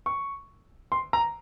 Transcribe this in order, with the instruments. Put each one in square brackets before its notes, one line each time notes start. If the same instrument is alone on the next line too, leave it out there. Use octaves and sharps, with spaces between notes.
[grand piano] C#6
C6
A#5